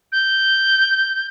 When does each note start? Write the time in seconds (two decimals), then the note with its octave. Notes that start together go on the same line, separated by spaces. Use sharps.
0.12 G6